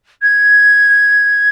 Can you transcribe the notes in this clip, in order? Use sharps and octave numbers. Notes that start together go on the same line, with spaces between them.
G#6